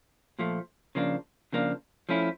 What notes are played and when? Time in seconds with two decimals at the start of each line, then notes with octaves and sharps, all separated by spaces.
0.39 A#2 F3 A3
0.95 C#3 F3 A#3 D4
1.53 C#3 F3 A#3 D4
2.09 F3 A3 C#4 E4